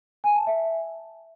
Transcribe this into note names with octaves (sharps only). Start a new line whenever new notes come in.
G#5
A5
E5